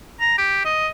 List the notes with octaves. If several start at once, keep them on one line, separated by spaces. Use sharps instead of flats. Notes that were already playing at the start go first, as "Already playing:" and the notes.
A#5
G4
D#5